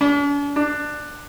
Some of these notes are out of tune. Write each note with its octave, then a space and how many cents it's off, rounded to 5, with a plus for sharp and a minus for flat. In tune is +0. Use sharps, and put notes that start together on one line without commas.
D4 -45
D4 +15